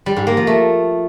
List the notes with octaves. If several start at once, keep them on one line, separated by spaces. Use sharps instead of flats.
G3
G#2
A#3
F3
A3